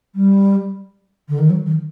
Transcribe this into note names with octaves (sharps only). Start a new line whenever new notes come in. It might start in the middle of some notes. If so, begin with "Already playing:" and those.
G3
D3
D#3
F#3
D#3